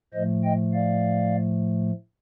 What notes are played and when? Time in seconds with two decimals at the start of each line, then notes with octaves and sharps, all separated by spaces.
0.14 A2 F3 A3 C5 D#5
0.44 D#5 G5
0.74 D5 F5